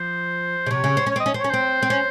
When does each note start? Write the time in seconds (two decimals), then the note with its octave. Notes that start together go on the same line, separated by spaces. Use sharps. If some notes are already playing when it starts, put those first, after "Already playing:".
Already playing: F3 C5
0.66 C#3
0.71 C3 C#5
0.84 C#3
0.97 C4
1.06 C#4
1.11 C#5
1.16 C4 D#5
1.26 C#4
1.34 C4
1.39 C#4 C#5
1.49 C4 C5
1.82 C4
1.90 C#4